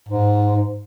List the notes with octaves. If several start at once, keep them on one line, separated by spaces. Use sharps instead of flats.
G#2